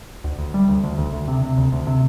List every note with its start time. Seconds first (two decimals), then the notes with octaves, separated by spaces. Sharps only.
0.24 D2
0.39 D2
0.54 G3
0.68 D2
0.84 D2
0.98 D2
1.13 D2
1.28 C3
1.43 C3
1.58 D2
1.72 D2
1.87 C3